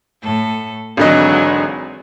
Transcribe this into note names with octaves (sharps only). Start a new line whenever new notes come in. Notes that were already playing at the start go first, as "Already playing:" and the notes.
A2 A4
G#1 D3 E3 F#3 G#3 D#5